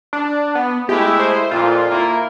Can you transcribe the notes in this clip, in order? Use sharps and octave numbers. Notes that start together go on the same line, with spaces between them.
D4
B3
G#3 A3 E4 G4
C5
F2 A#2 F4
A#3 E4 A#4